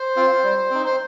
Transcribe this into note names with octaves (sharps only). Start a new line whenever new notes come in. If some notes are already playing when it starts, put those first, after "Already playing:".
Already playing: C5
C4 F4
G3
C4 D#4
C5